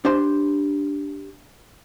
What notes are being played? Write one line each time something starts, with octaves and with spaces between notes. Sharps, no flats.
D4 G4 C5 C6